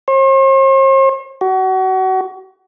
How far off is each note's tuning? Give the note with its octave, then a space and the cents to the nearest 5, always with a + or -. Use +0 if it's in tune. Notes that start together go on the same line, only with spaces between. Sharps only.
C5 +45
F#4 +30